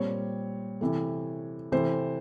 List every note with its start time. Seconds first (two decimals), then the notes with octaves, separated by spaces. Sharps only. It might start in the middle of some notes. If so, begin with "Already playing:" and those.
Already playing: A#2 G3 C4 C#5
0.81 C3 E3 A3
1.72 C3 E3 A3 C5